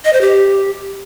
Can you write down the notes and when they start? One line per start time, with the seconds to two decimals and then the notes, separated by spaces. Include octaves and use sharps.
0.05 D#5
0.13 C5
0.21 G4